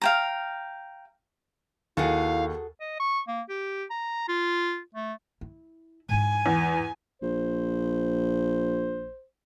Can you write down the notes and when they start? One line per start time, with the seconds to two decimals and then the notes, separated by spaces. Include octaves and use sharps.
0.01 F5 G5 A#5
1.97 D#2 E4 F#4 G#4 A4 F5
2.81 D#5
3.00 C#6
3.28 A#3
3.49 G4
3.91 A#5
4.28 F4
4.95 A3
5.41 E4
6.09 G#2 E4 G#5
6.46 E2
7.22 A#1 C5